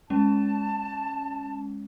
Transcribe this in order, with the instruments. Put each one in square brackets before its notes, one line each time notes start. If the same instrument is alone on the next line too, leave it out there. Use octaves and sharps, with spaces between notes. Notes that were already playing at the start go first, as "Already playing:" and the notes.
[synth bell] G#3 C#4 [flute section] A5